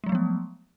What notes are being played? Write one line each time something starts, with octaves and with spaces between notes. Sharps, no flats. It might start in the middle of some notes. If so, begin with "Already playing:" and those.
F3 F#3 G#3 A3 B3